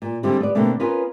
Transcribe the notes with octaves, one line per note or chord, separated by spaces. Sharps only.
A#2
D3 G3 G#3 C4 E4
B3 D5
B2 D3 A3 A#3 C4
B3 C#4 F4 A#4 B4